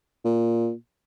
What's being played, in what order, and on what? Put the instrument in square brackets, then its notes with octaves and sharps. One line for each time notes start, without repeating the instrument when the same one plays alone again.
[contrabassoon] A#2